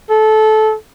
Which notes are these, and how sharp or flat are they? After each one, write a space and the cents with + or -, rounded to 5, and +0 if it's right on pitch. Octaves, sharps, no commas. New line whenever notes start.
A4 -20